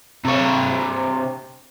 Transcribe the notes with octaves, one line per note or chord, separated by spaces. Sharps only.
C3 C#5